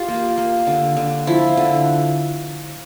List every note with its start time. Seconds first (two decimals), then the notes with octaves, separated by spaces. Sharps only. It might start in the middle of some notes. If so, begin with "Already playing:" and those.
Already playing: F4 G4
0.08 A#3
0.38 A#3
0.67 D3
0.97 D3
1.27 F3 E4
1.57 D3